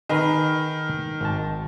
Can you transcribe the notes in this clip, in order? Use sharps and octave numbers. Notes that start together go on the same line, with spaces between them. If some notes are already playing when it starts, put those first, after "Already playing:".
D#3 G#4 B4 A#5
G#1 A5